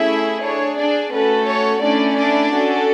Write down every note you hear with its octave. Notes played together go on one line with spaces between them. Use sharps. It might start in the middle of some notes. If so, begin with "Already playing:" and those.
Already playing: A3 C#4 E4 G#4 E5
D4 G#4 C#5
D4 D5
A3 C#4 F#4 A4 B4
C#5
A3 C#4 D4 E4 D5
D4 D5
C#4 F#4 A4